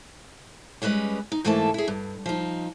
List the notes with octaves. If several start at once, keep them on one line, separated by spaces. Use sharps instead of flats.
G3 G#3 C#4 B4 D#5
D#4
G#2 E3 A3 A#3 A4 A5
E4 G#4
G2
F3 D#4